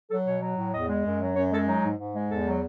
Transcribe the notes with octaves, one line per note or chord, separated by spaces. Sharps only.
F#3 A4
B2 C#5
F#3
A2
E2 D#5
G#3
F#2
F#3
F#2 C#5
G#3 A4
F#3 D#4
G#2
G#2
G#3
E2 A4
F#3